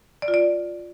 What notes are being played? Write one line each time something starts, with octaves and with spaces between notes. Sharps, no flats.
D5
F4
D5